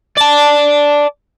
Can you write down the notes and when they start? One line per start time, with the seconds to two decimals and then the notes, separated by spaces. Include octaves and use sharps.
0.17 D5 A5